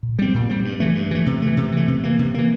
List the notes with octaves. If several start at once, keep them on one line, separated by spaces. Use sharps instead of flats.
A#2
G3 C4
A#2
G3 C4
G2
E3 A3
G2
E3 A3
C3
E3 A3
C3
E3 A3
C3
E3 A#3
C3
E3 A#3